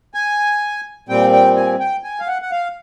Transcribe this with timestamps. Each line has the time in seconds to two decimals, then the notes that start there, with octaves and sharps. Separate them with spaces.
0.14 G#5
1.09 A#2 G3 C4 G5
1.33 G5
1.56 G#5
1.80 G5
2.04 G#5
2.20 F5
2.28 F#5
2.42 F#5
2.52 F5